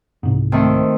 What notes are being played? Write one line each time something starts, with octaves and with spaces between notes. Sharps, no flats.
C2 G#2
D#3 A3 C4